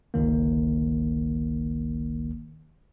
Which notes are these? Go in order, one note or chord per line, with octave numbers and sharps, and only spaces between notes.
G1 C#2 D#3 A#3